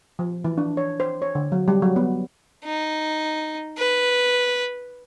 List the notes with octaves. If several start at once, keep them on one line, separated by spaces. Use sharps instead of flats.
F3
E3
D4
C#5
C5
C#5
D3
F#3
G3
F#3
B3
D#4
B4